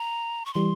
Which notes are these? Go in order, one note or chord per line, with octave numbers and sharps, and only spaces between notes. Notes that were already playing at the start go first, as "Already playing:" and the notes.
Already playing: A#5
C#6
E3 G3 C6